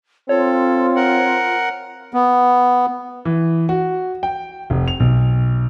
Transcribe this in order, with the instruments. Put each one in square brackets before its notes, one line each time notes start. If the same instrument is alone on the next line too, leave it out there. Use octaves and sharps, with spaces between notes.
[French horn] C4 [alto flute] F4 [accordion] A4 [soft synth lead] C#5
[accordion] A#4 F#5
[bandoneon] B3
[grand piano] E3
F#4
G5
F1
F7
B1